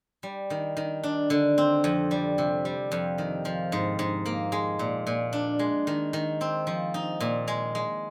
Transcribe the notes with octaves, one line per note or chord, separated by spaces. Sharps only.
G3
D#3
D#3
D4
D3
C4
F2
G3
C3
G3
F2
D#3
F3
G#2
G#2
A#3
G#3
A#2
A#2
D4
G#3
D#3
D#3
C4
F3
D#4
A#2
G#3
G#3